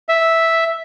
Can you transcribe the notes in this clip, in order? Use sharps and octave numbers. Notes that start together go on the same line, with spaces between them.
E5